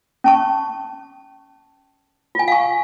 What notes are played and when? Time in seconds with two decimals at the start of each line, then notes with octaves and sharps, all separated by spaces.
0.24 C#4 A5 C#6
2.35 F4 G#5
2.48 F5 C#6